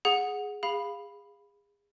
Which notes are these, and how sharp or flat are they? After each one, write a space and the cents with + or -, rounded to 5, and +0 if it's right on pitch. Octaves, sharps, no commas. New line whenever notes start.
G#4 +0 F#5 -15
G#4 -30 F5 +0 B5 +0